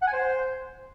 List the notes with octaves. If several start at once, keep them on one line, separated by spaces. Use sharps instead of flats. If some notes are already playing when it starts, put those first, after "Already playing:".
F#5
G#5
C5